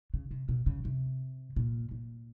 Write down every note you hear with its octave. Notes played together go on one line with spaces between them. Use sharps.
C#3
C3
B2
C#3
C3
A#2
A#2